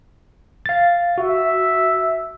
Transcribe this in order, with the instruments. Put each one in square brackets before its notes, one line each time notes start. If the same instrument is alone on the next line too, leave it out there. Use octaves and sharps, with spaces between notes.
[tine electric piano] F5 A6
[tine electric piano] F#4 [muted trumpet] E5